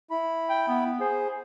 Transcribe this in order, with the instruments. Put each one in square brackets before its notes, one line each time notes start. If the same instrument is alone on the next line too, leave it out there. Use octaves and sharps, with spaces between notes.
[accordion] E4 B5
[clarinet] G5
B3
[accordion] G#4 [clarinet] C5